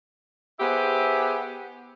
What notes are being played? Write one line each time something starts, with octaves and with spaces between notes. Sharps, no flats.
B3 E4 G4 G#4 C5